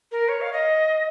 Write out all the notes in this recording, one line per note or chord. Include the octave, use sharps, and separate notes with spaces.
A#4
C#5
F5
D#5